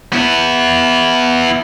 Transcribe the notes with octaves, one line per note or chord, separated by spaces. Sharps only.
B3 E4